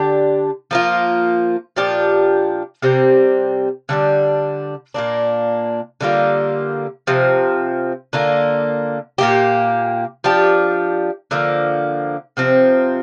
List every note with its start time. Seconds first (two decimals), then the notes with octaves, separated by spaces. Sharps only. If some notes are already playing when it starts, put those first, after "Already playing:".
Already playing: D3 D4 G4
0.71 F3 A#3 F4
1.76 A#2 F3 D4 G4
2.82 C3 G3 C4
3.89 D3 G3 D4
4.94 A#2 A#3 D4
6.01 D3 G3 A#3 F4
7.07 C3 F3 C4
8.13 D3 A#3 F4
9.18 A#2 A#3 G4
10.24 F3 D4 G4
11.31 D3 F3 A#3
12.37 C3 F3 C4